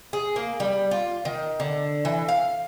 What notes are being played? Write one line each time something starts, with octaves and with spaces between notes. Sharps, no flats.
G#4
A#3
G3
F4
D#3
D3
E3
F5